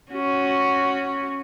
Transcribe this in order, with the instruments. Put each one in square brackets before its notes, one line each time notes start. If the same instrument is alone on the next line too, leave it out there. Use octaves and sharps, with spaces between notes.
[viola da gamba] C#4 F#4